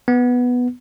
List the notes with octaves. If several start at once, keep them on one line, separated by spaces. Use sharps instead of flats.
B3